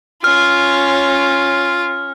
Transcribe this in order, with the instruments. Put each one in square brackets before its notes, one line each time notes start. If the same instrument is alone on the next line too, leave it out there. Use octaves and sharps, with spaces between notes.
[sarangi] C#4 [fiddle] F4 [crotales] F6